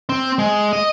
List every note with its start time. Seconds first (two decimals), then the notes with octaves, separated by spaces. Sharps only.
0.09 C4
0.38 G#3
0.73 D#5